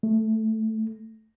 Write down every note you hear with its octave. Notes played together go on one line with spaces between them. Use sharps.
A3